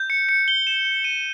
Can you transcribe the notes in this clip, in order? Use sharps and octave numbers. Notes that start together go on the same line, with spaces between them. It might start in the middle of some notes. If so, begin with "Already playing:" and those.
Already playing: G6
C#7
C#7
G7
E7
G7
D#7